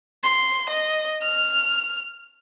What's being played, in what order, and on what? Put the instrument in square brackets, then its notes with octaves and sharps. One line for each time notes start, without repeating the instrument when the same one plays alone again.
[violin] C6
D#5
F6